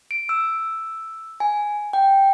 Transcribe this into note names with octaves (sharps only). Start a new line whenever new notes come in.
D7
E6
G#5
G5